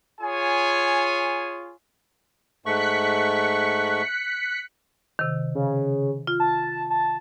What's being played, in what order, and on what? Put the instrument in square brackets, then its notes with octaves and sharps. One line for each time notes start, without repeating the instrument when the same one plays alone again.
[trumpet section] F4 G#4 C#5 G#5
[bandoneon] G#2 A3 C#6 [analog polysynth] F#6 B6 C#7
[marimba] C3 D#3
[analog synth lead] C#3
[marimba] F4
[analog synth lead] A5
A5